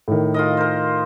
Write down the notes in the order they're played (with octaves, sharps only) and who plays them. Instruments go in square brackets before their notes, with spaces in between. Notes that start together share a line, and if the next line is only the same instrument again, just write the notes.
[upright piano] A2 D#3
[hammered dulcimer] F4 A#4 D#5
A#4 C5